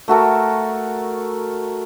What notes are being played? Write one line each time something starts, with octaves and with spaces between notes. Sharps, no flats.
A3 F#4 A4 A#4